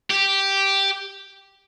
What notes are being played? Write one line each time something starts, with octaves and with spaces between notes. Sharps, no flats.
G4